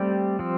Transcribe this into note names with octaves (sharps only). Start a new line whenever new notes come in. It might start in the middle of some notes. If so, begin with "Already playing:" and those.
Already playing: G3 A3 C4 G4
F3 C4